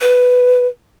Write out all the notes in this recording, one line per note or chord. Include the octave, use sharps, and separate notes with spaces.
B4